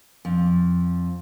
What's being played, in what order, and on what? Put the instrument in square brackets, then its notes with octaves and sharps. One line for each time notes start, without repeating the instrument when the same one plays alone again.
[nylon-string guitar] F2